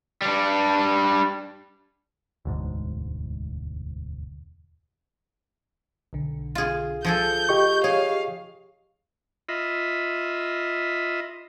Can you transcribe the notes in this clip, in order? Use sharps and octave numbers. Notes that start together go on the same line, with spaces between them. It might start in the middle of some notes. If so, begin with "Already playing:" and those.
G3 D4
E1 D2 G#2
B1 D3
F4 G#4
F3 G#4 A4 G6
G4 D#5 C#6
G#4 C#5 F5
F4 D#5 E5 B5